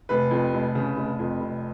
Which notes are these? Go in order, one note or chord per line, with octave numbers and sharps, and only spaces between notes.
F1 B4
F2
F1
C#3
F1
F2
F1